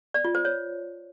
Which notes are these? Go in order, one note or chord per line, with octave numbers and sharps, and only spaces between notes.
D5
F4
C5
C#5